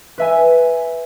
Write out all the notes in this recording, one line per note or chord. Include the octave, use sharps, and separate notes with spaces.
B4 E5 G#5